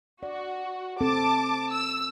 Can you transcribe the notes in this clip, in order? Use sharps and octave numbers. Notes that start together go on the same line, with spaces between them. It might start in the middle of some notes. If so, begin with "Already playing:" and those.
F#4 D5
C4 A4 A5 D6
E6